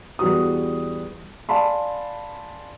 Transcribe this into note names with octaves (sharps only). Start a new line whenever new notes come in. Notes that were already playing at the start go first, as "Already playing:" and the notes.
E2 G3 F#4 D#6
D5 F5 G#5 A5 B5 C6